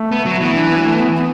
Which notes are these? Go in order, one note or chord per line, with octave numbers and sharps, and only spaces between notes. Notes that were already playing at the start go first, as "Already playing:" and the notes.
Already playing: A3
B3
F#3
E3 B3
D4
B3
F#3
A3
B3
B3